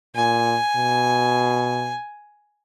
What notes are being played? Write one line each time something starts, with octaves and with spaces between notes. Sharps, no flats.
A#2 G#5
B2